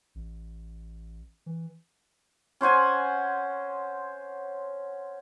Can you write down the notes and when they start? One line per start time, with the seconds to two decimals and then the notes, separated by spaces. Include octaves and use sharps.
0.15 A1
1.46 E3
2.61 C#4 C5 F#5 G#5